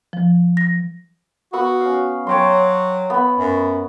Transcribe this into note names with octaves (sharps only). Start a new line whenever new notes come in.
F3
A#6
B3 F#4 B5 E6
C#4 F5
F#3 C#5 G5 C6
B3 B5
F#2